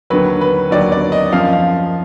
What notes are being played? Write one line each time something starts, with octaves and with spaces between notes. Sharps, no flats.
D#2 D3 F#3 B4
B4
D#2 D3 F#3 D5
D5
D#5
F#2 F3 F5
F5